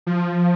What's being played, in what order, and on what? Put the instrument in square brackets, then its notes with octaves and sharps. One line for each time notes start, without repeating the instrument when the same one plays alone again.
[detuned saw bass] F3